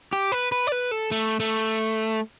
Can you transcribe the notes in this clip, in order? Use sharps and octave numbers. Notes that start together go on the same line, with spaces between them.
G4
B4
B4
D5
B4
A4
A3
A3